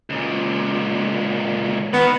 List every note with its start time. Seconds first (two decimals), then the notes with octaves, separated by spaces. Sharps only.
0.10 C#2 A#2
1.93 D#3 B3